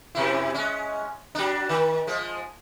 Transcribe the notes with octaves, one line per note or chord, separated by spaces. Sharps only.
F2 C3 E4
G#3 C#4
F#3 D4
D#3
F3 G#3